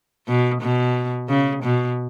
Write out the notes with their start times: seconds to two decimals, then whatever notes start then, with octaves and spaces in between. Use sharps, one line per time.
0.27 B2
0.61 B2
1.29 C#3
1.63 B2